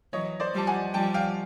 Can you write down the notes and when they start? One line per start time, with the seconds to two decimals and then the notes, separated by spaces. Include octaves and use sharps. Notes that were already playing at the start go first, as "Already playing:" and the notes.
0.13 E3 F#3 C#5 D#5
0.40 C5 D5
0.54 F3 G3 A5
0.67 F#5 G#5
0.94 F3 G3 G5 A5
1.14 F5 G5